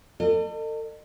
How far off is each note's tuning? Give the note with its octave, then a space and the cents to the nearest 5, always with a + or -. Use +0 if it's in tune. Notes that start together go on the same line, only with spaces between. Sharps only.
A4 +40 D#5 -40